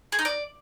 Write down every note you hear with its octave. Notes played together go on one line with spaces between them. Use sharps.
G#4
D#4
D5